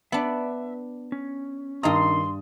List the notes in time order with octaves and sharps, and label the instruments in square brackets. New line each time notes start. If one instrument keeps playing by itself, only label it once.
[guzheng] B3 D4 [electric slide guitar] E5
[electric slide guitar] C#4
[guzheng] G2 A#5 [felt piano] D#3 D#5 D#6 [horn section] C6